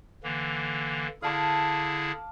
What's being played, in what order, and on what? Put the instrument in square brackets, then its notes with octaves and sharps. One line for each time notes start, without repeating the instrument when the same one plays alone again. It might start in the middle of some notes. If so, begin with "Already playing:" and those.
[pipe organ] D3 E3 A#3
[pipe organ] D3 E4 G#4 [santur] F5 A5 D6